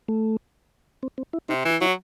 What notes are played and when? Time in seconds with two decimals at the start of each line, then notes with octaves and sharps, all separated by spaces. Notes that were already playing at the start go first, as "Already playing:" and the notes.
0.08 A3
1.03 C4
1.18 C4
1.33 E4
1.49 C3 D#4
1.65 E3 E4
1.81 F#3 E4